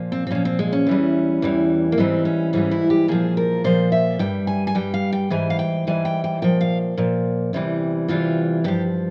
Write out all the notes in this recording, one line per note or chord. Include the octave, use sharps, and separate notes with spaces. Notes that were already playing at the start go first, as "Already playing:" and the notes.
Already playing: A#2 F3
C4
C4
A#2 F3 C#4
C4
G#3
C#4
E2 E3 G3
E2 E3 G3
A#3
G#2 E3 G3 C4
C#4
G#2 E3 G3 C#4
E4
G4
A#2 F3 G#4
A#4
A#2 F3 C5
E5
G2 G3 G5
G#5
G#5
G2 G3 G5
F5
G5
G#2 E3 G3 G#5
F5
G5
G#2 E3 G3 G#5
G5
G5
A#2 F3 G5
F5
A#2 F3
E2 C3 E3 G3
E2 C3 E3 G3 F4
G2 F3 G4